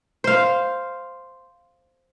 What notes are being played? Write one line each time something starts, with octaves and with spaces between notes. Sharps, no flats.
C5 F5